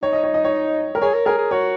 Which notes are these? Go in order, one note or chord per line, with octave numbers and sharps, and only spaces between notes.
D#4 C#5
D#5
C#5
D#5
C#5
A#4
G#4 C#5
A#4
G#4 A#4
G#4
F#4 C#5